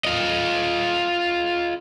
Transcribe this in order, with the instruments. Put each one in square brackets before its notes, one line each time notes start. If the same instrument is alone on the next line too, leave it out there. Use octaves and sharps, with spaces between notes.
[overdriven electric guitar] F4 D#5